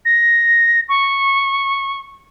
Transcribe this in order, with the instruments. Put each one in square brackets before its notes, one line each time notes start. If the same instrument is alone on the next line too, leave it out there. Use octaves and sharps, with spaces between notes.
[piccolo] A#6
C#6